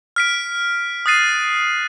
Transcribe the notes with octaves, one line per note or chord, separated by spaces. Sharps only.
F6 B6 D7
D#6 F#6 A6 C7 D#7